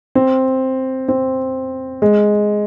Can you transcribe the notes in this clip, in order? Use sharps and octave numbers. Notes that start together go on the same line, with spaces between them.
C4
C4
G#3